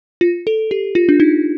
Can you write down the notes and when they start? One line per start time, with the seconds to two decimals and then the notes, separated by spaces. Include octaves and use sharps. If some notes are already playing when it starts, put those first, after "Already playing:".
0.21 F4
0.47 A4
0.71 G4
0.95 F4
1.09 D4
1.20 D#4